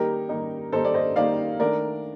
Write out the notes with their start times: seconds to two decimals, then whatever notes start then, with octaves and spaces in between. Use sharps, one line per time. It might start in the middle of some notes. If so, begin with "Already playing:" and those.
Already playing: D#3 G3 A#3 D#4 G4 A#4
0.29 D#3 G3 A#3 D#4
0.72 D#3 G3 A#3 D#4 A4 C5
0.84 D5
0.94 C5 D#5
1.16 D#3 G3 A#3 D#4 D5 F5
1.59 D#3 A3 D4 A#4 D5